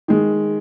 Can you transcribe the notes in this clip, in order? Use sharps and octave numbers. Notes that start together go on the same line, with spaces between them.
D#3 G#3